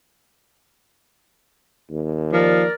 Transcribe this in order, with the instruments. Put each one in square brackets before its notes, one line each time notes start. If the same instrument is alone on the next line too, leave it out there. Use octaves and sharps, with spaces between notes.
[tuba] D#2
[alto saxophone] F3 [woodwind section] A#4 D5